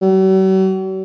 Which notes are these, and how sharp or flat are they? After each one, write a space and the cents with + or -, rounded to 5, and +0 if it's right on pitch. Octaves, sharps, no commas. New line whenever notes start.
F#3 +45